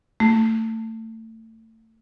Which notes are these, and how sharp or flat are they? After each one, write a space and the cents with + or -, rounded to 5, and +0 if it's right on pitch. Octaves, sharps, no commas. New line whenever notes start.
A3 +30